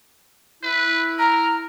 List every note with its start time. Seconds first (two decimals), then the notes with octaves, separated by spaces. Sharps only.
0.63 E4 B4
1.19 A#4 A#5